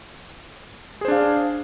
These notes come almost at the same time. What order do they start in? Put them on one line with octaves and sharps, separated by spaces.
G#4 C5 D4 F5